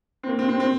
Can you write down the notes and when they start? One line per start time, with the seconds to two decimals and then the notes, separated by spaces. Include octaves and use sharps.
0.23 C4
0.28 A#3
0.39 C4
0.49 C4
0.60 C4